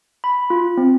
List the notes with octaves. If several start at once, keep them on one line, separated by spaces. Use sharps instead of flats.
B5
F4
C4